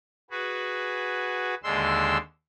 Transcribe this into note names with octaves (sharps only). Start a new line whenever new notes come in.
F#4 G#4 B4
D#2 D3 G#3 C6 E6